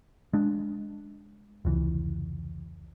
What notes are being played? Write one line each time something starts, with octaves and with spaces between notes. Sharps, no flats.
G#3 D4
F1 C#2 E3